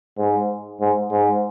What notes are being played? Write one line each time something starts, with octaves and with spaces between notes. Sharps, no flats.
G#2
G#2
G#2